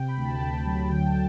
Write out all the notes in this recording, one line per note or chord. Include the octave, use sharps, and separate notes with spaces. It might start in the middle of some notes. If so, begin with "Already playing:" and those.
Already playing: C3 G5
B5
D2
A5
D2 G5
F#3
D3 G5
A5